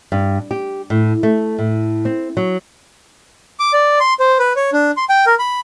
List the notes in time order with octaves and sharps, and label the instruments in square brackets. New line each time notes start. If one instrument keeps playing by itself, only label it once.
[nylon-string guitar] G2
G4
A2
A3
A2
C4
F#3
[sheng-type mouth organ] D6
D5
C6
C5
B4
C#5
D4
C6
G5
A#4
B5